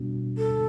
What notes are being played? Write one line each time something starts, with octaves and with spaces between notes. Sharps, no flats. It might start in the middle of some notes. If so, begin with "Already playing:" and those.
Already playing: B2 G3 B3 D4 F#4
A4